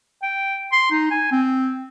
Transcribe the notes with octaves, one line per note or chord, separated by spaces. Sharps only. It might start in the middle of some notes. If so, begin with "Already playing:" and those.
G5
C6
D#4
G#5
C4